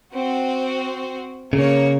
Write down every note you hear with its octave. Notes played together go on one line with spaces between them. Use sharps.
C4 F#4
C#3 A#3 C#5